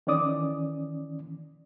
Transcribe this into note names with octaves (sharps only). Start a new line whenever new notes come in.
D#3 E3 C#4 D5 D6 D#6